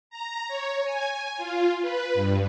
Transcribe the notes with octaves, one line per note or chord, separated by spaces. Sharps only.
A#5
C#5
G#5
F4
B4
G2